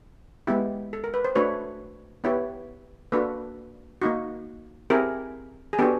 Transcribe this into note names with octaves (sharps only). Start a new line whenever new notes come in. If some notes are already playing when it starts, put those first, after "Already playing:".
G#3 B3 E4 G4
A4
A#4
B4
C5
A3 D4 F#4 B4 C#5
B3 E4 G4 B4 C#5
A#3 D4 F#4 A4 B4
A#3 D#4 F#4
C4 E4 G4 G#4 A#4
G#4
B3 D4 F#4 G4 A4